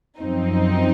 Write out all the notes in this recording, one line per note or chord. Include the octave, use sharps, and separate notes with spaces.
F#2 F3 C4 D#4